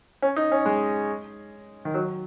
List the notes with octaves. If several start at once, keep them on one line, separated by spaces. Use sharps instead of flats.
C#4
D#4
C#4
G#3
D#3
F#3